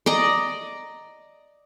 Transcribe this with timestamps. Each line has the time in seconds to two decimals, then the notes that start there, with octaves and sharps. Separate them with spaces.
0.06 D5 D#5 A#5